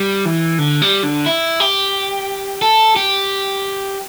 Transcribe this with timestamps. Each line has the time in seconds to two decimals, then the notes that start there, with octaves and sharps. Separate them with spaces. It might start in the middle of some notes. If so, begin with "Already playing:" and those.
Already playing: G3
0.25 E3
0.58 D3
0.82 G3
1.03 D3
1.26 E4
1.60 G4
2.62 A4
2.96 G4